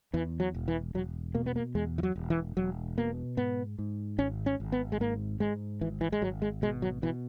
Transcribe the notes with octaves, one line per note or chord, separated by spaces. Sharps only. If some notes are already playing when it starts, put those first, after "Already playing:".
E2 E3
F#3
E1
E3
E1 F#3
B2 A#3
B3
A#3
E2 G#3
E3
F#3
E1
E3
E1 F#3
B2 A#3
G#2 B3
G#2
G#1 C#4
C#4
G#1
B3
G#3
G#2 A#3
G#2 G#3
G#1 E3
E3
G#3
G#1 F#3
G#3
B2 G#3
F#3
B2 E3